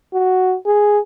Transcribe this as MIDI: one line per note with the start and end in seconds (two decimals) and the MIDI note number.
0.13 0.55 66
0.66 0.99 68